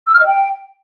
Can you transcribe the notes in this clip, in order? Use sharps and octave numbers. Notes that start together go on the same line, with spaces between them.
E6
F6
D#5
G5